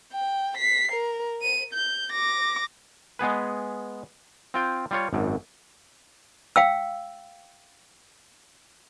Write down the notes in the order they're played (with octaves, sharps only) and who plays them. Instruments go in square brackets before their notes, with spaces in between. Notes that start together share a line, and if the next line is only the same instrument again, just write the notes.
[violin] G5
B6 C7
A#4
D#7
G6
D6 A#6
[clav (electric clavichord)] G#3 B3 G#4 B4
C4 F4 G5
G3 F4 C#5
G#1 F#2
[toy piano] F5 G5 E6